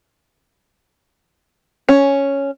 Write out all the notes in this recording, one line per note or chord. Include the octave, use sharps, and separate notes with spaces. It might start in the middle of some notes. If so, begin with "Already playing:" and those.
C#4